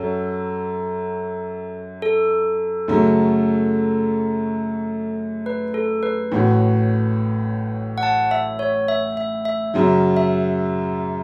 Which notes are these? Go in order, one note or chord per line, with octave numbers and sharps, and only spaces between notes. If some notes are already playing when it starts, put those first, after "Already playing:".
Already playing: F#2 F#3 C#4 A4
A4
F#2 C#3 F#3 A3
B4
A4
B4
A1 A2 A3 F#4
F#5
A5
E5
C#5
E5
E5
E5
F#2 C#3 F#3
E5